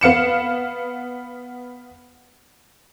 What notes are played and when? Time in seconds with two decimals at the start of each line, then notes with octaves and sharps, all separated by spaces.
0.01 B3 F5 C#7 E7